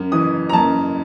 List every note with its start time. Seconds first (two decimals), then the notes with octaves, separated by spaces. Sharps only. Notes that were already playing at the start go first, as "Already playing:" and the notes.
Already playing: F#2
0.12 E3 D#6
0.49 A#5
0.53 F#2 A5